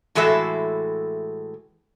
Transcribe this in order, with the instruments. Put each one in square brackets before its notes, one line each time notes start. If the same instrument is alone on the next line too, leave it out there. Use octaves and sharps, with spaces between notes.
[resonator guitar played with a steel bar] A2 E3 G#3 F#4 A4 E5